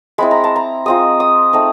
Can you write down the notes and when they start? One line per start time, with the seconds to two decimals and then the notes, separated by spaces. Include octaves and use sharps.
0.18 G#3 C4 E4 B5
0.31 A#5
0.44 A5
0.56 A#5
0.86 G#3 C4 F4 D#6
1.20 D#6
1.53 A3 C4 D#4